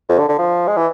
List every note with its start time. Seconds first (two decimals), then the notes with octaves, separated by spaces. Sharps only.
0.09 F2
0.19 D3
0.29 D3
0.38 F3
0.67 G#3
0.77 E3